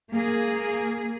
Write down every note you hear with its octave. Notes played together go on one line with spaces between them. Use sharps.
A#3 G#4